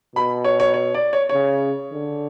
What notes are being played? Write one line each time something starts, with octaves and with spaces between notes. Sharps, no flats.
B2 B5
C#5
C#5
C#5
D5
C#5
C#3 C#5
D3